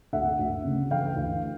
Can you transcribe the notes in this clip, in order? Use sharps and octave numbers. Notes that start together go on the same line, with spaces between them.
D2 E5 F#5
D2
C#3
E3 F5 G5
D2